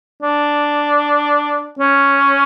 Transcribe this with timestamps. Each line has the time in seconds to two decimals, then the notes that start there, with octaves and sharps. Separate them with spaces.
0.22 D4
1.79 C#4